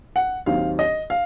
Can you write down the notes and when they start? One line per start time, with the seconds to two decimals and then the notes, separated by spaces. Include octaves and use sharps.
0.16 F#5
0.46 D#2 D#3 F#3 C4 F5
0.79 D#5
1.10 F5